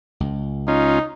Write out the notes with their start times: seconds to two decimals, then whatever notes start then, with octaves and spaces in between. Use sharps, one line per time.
0.20 C#2
0.68 C#4 D#4 F4